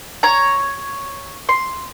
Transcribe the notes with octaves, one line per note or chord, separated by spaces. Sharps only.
C#5 A#5
C6